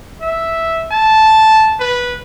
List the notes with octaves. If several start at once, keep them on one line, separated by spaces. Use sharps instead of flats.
E5
A5
B4